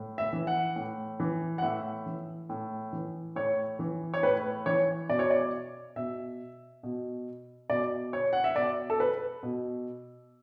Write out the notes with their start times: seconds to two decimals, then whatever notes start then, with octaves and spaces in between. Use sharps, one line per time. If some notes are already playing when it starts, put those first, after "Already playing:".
Already playing: A2
0.18 E5
0.33 E3
0.47 F#5
0.76 A2
1.20 E3
1.58 F#5
1.62 A2 E5
2.06 E3
2.49 A2
2.93 E3
3.36 A2 C#5
3.79 E3
4.14 C#5
4.23 A2 B4
4.66 E3 C#5
5.09 B2 D5
5.19 C#5
5.30 D5
5.96 B2 E5
6.83 B2
7.69 B2 D5
8.13 C#5
8.33 F#5
8.44 E5
8.56 B2 D5
8.90 A4
9.00 B4
9.43 B2